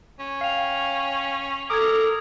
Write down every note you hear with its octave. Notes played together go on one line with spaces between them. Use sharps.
C#4
F5 G5 C7 F7
A4 A#4 D6 D#6 G#6